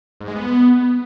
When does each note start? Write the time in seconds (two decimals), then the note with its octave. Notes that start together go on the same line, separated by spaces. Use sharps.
0.21 G#2
0.28 G#3
0.35 B3